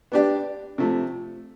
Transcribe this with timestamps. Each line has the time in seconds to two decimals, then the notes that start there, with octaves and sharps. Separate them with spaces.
0.12 B3 D4 G4 D5
0.78 C3 F3 A3